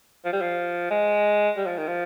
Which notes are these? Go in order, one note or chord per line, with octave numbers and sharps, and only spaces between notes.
F3
G3
F3
G#3
G3
F3
D#3
F3